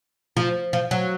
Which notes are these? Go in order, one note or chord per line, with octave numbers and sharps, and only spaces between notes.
F3
F3
F#3